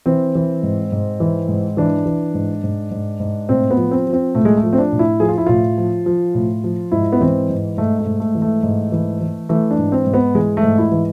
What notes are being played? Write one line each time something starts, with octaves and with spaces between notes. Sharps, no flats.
E3 C4
E3
G#2
G#2
E3
G#2
E3 D4
E3
G#2
G#2
G#2
G#2
A2 C4
B3
F3
C4
F3
C4
A2 A3
G#3
A3
F3
C4
D4
A2
E4
F3 G#4
F4
E4
A2 F4
F3
F3
A2
F3
G#2 E4
B3
E3 C4
G#2
G#2 A3
A3
G#2
A3
E3
A3
G#2
E3
E3
E3 A3
D4
G#2
C4
G#2
B3
E3 G#3
A3
G#2
E4
E3